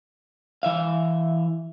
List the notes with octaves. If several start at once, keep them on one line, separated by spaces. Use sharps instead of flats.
E3 E5 F5